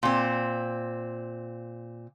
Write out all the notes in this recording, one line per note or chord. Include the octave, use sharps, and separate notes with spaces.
A#2 C4